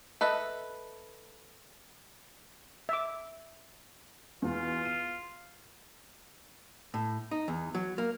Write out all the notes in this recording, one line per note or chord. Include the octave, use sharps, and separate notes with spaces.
A4 B4 D#5 E5
E5 D6
E2 B2 F4
D#7
A2
D#4
E2
F#3
A#3